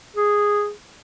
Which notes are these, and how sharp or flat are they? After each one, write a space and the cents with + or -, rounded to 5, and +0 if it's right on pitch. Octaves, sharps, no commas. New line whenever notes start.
G#4 -5